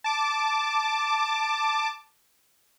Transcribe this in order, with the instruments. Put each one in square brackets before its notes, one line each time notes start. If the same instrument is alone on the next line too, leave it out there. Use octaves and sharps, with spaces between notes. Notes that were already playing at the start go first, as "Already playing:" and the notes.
[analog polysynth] A5 D6